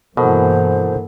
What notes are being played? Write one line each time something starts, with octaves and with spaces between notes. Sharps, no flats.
G2 B2 E3 A#3 A4 A#4 C5 F#5